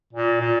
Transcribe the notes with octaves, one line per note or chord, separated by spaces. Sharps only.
A#2
A#2